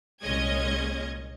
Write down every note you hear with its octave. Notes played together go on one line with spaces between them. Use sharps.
C2 A#2 G#3 C#4 D#5 G#6